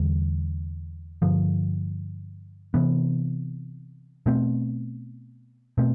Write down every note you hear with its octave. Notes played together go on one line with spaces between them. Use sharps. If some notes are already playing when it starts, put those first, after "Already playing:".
Already playing: E2 D3 G3
G2 D3 F3
C3 E3 B3
B2 A3 C4
B2 A3 C4